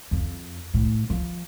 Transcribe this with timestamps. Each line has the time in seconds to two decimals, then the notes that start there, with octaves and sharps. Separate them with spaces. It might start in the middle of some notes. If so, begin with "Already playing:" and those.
0.11 F2
0.74 A2
1.10 F3